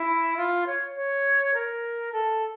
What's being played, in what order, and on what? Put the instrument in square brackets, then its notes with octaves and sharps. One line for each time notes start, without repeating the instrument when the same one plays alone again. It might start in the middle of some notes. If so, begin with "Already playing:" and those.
Already playing: [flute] E4
F4
C#5
C#5
A#4
A4